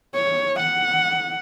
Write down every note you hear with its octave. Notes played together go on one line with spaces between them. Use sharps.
C#5
F#5